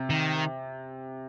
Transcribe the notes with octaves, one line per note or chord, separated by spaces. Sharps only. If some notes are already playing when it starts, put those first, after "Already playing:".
Already playing: C3
D#3